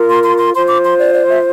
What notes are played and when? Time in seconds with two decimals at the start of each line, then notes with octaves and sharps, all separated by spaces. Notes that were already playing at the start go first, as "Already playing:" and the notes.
Already playing: F4 A#4
0.09 C6
0.24 C6
0.38 C6
0.54 F4 C5 C6
0.68 D6
0.84 C6
0.99 D5
1.13 D5
1.28 E5